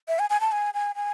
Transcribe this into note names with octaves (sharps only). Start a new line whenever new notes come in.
E5
G#5
G#5
A5
G#5
G#5
G#5